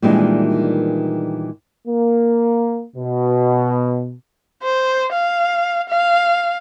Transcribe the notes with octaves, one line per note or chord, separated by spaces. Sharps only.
A#2 D#3 E3 G3 G#3 D4
A#3
B2
C5
F5
F5